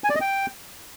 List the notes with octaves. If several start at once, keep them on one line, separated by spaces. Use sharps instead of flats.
G#5
D5
D#5
G5